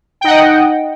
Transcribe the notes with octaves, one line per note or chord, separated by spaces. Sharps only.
D#4 D#5 F#5 G5